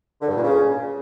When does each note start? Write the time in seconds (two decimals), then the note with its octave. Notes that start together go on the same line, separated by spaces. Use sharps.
0.21 D3
0.29 G2
0.36 A#2
0.43 C#3